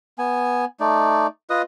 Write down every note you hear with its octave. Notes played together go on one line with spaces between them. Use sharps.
B3 G#5
A3 D#4 D5
F4 B4 D#5 D#6